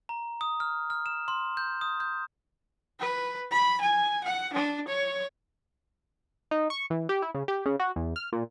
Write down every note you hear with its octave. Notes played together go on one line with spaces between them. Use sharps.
A#5
D#6
F6
F6
E7
C6
G6
D#6
G6
B4
B5
G#5
F#5
D4
C#5
D#4
C#6
E3
G4
E4
C#3
G4
C#3
F#4
E2
F6
A#2